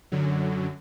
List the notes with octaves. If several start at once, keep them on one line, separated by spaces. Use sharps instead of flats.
F#2 D3 F#3